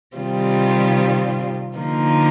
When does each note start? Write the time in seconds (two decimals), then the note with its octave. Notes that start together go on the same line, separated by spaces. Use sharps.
0.16 C3 D#3 G3 C4 F4
1.78 D3 F3 A#3 D#4